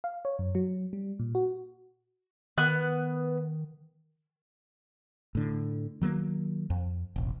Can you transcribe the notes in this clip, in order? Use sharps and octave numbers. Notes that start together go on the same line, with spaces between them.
F5
C#5
F#2
F#3
G3
A#2
F#4
D#3 B3 F#6
A2 D3
D#3 F#3 G#3 A#3
F2
E1 A1